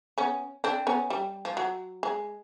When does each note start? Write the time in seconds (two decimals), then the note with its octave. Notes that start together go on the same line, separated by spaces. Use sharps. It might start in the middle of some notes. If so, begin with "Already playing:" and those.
0.18 B3 C#4
0.64 C4 D4
0.87 B3 C#4
1.10 G3
1.45 F3
1.57 F#3
2.03 G#3